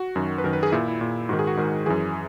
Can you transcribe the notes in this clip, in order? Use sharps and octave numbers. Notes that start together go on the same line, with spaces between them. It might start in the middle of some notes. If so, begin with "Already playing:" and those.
Already playing: F#4
F#2 D#3
B4
F#2 D#3 A#4
B4
G#4
A#2 E4
E4
A#2
G#2 D#3 F#4
G#4
F#4
G#2 D#3
F#2 E3 G#4